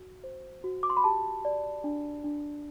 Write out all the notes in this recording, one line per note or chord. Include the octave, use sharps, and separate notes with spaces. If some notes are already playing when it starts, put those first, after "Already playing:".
Already playing: F#4
C5
F#4
D6
C6
B5
G4 A5
D5
D4
D4